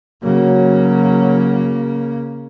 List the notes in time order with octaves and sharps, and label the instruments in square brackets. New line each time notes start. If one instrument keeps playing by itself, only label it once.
[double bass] C#3 A#3 [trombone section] F#3